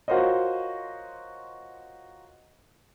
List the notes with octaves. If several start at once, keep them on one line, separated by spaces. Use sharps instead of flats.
F4 F#4 A#4 C5 C#5 D#5